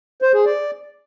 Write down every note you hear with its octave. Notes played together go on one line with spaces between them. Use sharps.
C5
G#4
D5